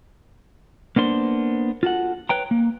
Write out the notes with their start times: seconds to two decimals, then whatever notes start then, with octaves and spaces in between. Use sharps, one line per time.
0.96 A#3 B3 D4 C5
1.83 F4 F#4 A4 F#5
2.29 B4 C#5 G5 A#5
2.51 A#3